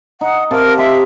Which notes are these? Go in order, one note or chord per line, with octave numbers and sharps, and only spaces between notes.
D#4 F#5
C3 A#4 F5 A5
G4 E5 C6